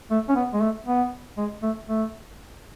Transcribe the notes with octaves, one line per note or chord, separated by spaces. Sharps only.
A3
C#4
B3
G#3
A3
B3
G#3
A3
A3